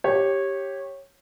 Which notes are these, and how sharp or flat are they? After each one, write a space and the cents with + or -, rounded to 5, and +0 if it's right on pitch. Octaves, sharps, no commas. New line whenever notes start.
G4 +0 C#5 -15